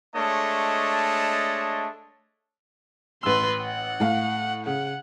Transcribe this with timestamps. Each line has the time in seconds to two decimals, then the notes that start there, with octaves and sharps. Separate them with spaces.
0.16 G#3 A3 D4 C#5 D#5 A5
3.23 A1 B4 C6 E6
3.62 F#5
4.00 A2 F5
4.66 C#3 F#5